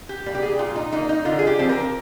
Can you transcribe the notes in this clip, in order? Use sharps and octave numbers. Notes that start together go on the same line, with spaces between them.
G4
G3 A#3
G4
G#4
A#2 F4
D#4
G3 A#3 D#4
D#4
D3 F4
G#4
G4
F3 C4
A#4